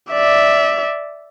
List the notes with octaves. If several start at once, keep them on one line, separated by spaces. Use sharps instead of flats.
D5 E5